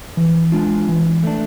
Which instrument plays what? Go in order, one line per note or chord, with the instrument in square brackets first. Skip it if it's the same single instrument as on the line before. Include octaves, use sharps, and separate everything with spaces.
[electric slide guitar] E3
G#3 D4 F4
E3
A3 D4